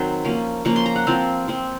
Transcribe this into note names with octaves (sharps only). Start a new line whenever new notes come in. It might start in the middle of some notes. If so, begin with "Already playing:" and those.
Already playing: D#3 F#3 C4 C6
F3 A#3 C#4
F3 A#3 C#4 C#6
C6
A#5
F#5
F3 C4 F5
F3 C4